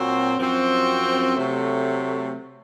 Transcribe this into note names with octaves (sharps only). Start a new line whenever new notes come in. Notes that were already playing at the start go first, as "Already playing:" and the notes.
Already playing: A#2 F#3 C4 F#4
F#2 F3 C4 F#4
C3 F#3 A3